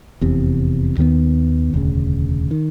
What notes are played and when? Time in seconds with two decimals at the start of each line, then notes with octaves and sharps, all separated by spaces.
0.21 F1 E2 C3
0.98 D#2 D#3 G#3 B3
1.74 E1 D2 C#3
2.51 D#3